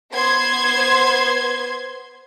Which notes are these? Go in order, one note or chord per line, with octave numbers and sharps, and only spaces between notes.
B3 C5 C6 G#6